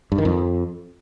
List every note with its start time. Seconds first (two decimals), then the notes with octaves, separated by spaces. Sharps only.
0.12 G2
0.18 D#3
0.25 F2